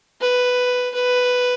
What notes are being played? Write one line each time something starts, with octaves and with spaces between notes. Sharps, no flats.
B4
B4